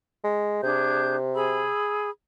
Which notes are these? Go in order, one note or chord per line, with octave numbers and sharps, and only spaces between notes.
G#3
C3 D4 G#4 G6
G#4 B5 E6